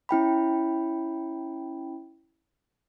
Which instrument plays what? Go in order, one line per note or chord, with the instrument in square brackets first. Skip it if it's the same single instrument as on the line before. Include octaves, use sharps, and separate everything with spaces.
[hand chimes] C#4 E4 G5 B5